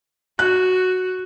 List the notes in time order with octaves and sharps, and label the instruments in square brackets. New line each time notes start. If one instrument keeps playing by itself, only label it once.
[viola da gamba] F#4 [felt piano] F#6